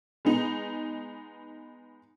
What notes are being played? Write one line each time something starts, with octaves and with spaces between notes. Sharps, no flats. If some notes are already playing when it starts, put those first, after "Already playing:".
G#3 B3 D#4